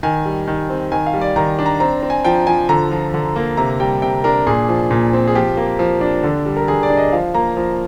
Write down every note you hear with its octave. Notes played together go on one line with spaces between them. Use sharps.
D#3 G#5
G3
D#3
C4
D#3 G#5
F5
G3
D5
D#3 A#5
D4
A#5
C4 A#5
C4
G#5
F3 G5
F3 G#5
D3 A#5
F3
D3
A#3
C3 A#5
G3 G5
C3 G5
D4 A#4
A#2 G#4
F3
A#2
C4
G#4
F3 G4
A#3
F3
D4
D3
G3
A#4
D3 G#4
D5
D4
D#5
F3 F5
A#3 A#5
F3